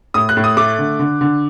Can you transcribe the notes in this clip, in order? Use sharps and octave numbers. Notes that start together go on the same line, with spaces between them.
A2 D#6
F#6
A2
D#6
A3 D6
D3
D3
D3